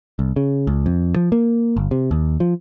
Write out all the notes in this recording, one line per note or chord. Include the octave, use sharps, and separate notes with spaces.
C2
C#3
C#2
F2
F3
A#3
G1
C3
D#2
F3